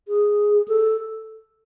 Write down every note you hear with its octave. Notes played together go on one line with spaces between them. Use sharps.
G#4
A4